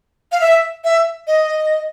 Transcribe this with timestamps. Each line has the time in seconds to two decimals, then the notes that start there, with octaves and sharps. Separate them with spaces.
0.32 F5
0.41 E5
0.84 E5
1.27 D#5